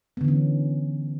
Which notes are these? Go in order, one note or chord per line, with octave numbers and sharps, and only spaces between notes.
D3 E3 B3 C#4